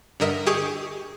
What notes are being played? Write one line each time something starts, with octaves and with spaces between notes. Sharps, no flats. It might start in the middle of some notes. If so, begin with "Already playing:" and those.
G2 D3 A#4 D#5 E5 B6
G4 G#4 C#6 D#6